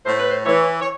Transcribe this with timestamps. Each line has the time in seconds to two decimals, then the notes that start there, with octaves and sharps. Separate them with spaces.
0.06 A2 C5
0.18 B4
0.30 C5
0.46 E3 C#5
0.81 C#5